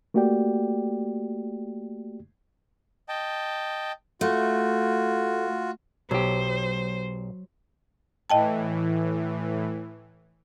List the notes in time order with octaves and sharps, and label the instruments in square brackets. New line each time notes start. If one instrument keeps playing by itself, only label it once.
[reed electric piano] A3 A#3 F#4 G4 D5 G5
[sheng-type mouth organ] D#5 G5 A5
[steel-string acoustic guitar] A3 [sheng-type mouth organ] F4 F#4
[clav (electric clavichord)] B1 G4 [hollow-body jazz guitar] F#3 [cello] C5
[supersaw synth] A2 E3 [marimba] D#5 G5 A5